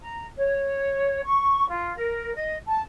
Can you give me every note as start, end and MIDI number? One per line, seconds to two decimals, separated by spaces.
0.01 0.25 82
0.37 1.23 73
1.25 1.67 85
1.68 1.95 65
1.96 2.32 70
2.35 2.56 75
2.65 2.80 81